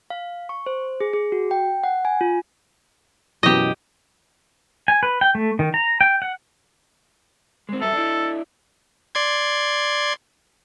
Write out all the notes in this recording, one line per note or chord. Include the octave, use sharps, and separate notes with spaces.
F5
C#6
C5
G#4
G#4
F#4
G5
F#5
G#5
F4
F#2 B2 E3 G4 D#5
G#5
B4
G5
A3
D#3
A#5
G5
F#5
G#3 C4
G2 F#3 A4 E5
D4 E4
D5 C6 G#6